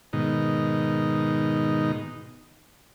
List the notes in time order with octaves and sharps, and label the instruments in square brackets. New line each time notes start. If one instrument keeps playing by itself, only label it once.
[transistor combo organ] G#2 B2 D#3 D#4